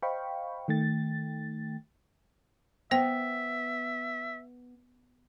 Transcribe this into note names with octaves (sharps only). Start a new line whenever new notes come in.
C5 D#5 F5 G5 B5 C#6
D#3 A3 G5 A6
B3 C5 E5 G5